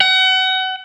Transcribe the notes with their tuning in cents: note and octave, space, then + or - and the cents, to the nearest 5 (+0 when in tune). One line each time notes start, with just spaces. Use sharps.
F#5 +30